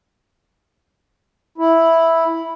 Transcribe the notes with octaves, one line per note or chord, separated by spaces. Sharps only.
E4